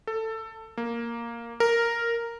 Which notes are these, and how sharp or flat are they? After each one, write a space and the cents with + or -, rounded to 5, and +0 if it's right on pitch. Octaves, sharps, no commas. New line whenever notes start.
A4 +15
A#3 +0
A#4 -5